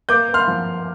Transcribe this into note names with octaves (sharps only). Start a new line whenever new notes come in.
A#3 D6 G6
A#3
C6 F6
F3